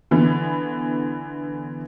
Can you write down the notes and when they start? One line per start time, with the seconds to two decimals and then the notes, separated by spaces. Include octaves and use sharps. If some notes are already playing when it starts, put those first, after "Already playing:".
0.11 D3 E3 B3